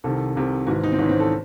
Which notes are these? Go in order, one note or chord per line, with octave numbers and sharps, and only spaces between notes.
C2 C3 D#3 A4
C2 C3 D#3
G#1 G#2 E3 F#4
D#4
C4
G#1 G#2 E3 C#4
C4
A4